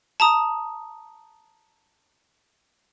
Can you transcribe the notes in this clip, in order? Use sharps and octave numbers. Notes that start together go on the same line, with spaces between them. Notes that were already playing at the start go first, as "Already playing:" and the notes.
A5 A#5 D#6